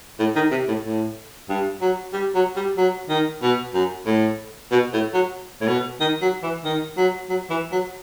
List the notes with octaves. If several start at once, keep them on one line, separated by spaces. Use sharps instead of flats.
A2
D#3
C3
A2
A2
G2
F#3
G3
F#3
G3
F#3
D#3
B2
F#2
A2
B2
A2
F#3
A2
B2
D#3
F#3
E3
D#3
F#3
F#3
E3
F#3